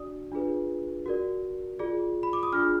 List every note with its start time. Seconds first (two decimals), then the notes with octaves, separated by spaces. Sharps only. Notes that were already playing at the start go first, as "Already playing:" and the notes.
Already playing: D4 F#4 D5 D#6
0.32 D4 F4 G#4 B4
1.06 F#4 A#4 D5
1.79 F4 G#4 D5
2.23 B5
2.33 D6
2.43 D#6
2.53 D4 F4 G#4 F6